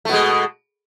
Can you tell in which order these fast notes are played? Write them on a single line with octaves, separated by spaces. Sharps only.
A3 B2 G#3